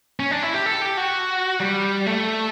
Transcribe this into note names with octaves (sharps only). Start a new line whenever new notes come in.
C#4
D4
E4
G4
A4
G4
F#4
G3
A3